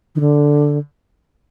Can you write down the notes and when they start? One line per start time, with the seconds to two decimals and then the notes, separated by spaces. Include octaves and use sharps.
0.15 D#3
0.20 D3